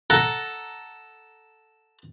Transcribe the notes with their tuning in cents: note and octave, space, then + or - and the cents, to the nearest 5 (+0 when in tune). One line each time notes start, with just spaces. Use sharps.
A4 +0 F#5 +0 A#5 +0